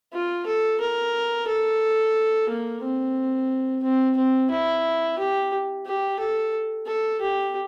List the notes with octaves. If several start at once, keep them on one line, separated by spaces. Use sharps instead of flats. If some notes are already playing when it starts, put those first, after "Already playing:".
F4
A4
A#4
A4
A#3
C4
C4
C4
E4
G4
G4
A4
A4
G4